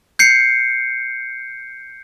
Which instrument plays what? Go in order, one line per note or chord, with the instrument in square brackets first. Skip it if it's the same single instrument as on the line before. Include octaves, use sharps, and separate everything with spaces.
[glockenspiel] G6 C7 C#7